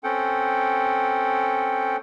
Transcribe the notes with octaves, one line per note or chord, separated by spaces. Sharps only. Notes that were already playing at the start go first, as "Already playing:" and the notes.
C4 C#4 A4 F#5 G5